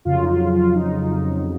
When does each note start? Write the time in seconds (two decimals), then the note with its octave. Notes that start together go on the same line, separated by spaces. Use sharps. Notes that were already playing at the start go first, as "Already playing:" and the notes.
0.05 F2 C#3 F#3 F4
0.24 D#4
0.29 F4
0.53 F4
0.75 D#4